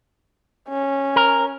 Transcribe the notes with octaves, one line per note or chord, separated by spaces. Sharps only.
C#4
A#4